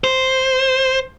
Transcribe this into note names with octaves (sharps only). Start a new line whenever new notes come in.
C5